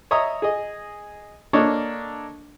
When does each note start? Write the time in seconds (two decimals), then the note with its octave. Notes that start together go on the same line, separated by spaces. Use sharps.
0.11 C#5 D#5 E5 A#5 D#6
0.42 G#4 D#5
1.53 A#3 D4 A4 C#5 D#5